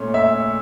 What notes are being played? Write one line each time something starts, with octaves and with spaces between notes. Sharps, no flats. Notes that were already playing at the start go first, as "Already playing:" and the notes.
Already playing: A#2 A3 C#4
E5